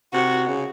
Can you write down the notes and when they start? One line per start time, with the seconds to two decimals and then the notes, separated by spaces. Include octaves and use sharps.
0.13 C3 F#4
0.48 C#3